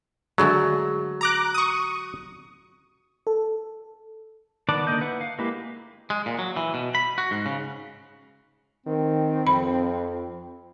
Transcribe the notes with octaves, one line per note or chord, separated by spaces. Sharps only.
D3 F#3 G#3 A3
A#5 D6 F#6
C#6 D#6
A4
D#3 B3 D5 F#5 A5
D3 A#3 D#5 G6
E4 B4 F#5
F5
G#3 A#3 E4 G4 B4
G#3
A#2
F#3
E3
B2
B5
F#4
G#2
C#3
D#3 C4
F2 B5